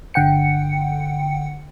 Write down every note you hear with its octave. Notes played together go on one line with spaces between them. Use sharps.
G1 D3 F#5 G5 C#7